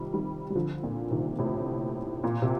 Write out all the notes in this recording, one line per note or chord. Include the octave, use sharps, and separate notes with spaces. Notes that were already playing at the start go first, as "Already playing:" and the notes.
Already playing: C3 D#3 F3 G3
D#3 G3
G3
D3 F3
A#2
C3 D#3
A2 C3
A#2
C3